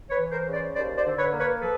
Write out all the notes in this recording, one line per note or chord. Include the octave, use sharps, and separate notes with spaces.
B4 C#5
E3
A#4 C5
C#3
C5 D5
D#2 C5 D5
C5 D5
D3
B4 C#5
A#3
B4 C#5
F3 A4 B4